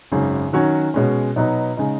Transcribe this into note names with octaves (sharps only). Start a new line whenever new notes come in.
G#1 F#2 C#3
D#3 F#3 C#4 F#4 C#5
B2 G#3 C#4
B2 F#3 B3 D#4
C#3 G#3 D#4